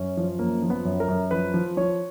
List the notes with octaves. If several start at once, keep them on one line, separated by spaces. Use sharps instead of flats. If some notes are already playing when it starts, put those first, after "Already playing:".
Already playing: F#2 C#4
F3
F#2 A#3
F3
B3
F#2
A#4
F#2
F3 B4
F3
F3 C#5